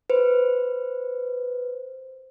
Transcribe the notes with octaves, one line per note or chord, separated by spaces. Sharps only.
B4 C5